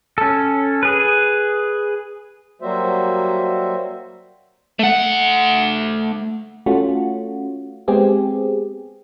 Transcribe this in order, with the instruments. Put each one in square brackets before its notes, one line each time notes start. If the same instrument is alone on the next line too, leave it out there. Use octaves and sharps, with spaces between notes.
[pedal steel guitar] C#4 A4
G#4 B4
[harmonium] F#3 G3 A#3 F#4 C5 E5
[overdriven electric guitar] A3 F#5
[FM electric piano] A3 C#4 F4 F#4
G#3 B3 C4 G4 G#4